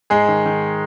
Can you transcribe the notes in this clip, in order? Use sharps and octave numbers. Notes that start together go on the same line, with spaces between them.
G#2 G#3 G#4
D#3
D#3